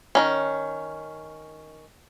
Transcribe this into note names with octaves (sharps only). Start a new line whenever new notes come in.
D#3 F#3 C#4